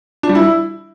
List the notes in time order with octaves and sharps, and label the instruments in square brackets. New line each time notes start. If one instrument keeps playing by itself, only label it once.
[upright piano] D4
G3
E4